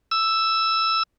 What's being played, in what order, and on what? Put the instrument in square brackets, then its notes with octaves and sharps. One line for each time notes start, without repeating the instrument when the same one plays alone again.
[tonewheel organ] E6